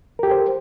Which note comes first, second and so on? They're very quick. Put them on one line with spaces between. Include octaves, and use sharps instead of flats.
A#4 G4 A4 C5